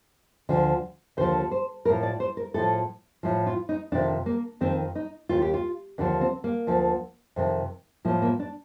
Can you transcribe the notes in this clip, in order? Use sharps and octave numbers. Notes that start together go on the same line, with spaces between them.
D2 D3 F3
D#2 D3 F3 C5
C5
A2 F3 A#4
D5
C5
A#4
A2 F3 A4
A2 F3
F4
D#4
F2 C3 D#3 D4
A#3
F2 D#3 C4
D#4
D#2 D#3 F4
G4
F4
D#2 D3 F3 D4
C4
A#3
D2 D3 F3
F2 C3 D#3
A2 F3 A#3
A#3
D4